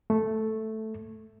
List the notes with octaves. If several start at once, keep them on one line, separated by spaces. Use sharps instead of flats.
A3